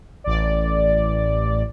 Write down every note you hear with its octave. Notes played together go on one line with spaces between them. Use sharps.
A1 D5